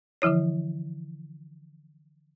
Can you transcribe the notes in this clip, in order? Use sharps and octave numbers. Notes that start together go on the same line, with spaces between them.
D3 E3 F3 E4 C#5